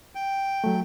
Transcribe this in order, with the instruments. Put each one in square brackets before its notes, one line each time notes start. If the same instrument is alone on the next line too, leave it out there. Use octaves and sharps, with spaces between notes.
[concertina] G5
[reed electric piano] F#3 A3